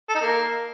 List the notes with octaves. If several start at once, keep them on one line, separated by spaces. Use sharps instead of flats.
A4
D#4
A#3